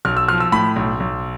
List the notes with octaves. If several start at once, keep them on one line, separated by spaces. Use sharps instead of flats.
B1 F6
E6
F3 F6
E6
A2 B5
B1
B1